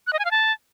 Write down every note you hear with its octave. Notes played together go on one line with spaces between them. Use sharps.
F#6
D#5
G#5
F5
A5